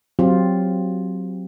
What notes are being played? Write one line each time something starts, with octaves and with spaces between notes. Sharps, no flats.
F#3 C4 F4 G4